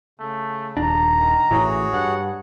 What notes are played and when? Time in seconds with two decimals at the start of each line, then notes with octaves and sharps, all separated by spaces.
0.19 C#3 A3
0.77 D#1 D4 A#5
1.16 D#3
1.51 A1 A2 E3 F#4 G#4 C#5
1.93 G2 F#5